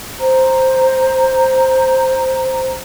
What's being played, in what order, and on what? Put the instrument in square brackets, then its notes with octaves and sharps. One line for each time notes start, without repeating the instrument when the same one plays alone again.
[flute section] C5 A#5